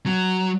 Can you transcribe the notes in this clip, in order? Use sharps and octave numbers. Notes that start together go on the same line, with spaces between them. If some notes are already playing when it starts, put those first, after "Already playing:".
F#3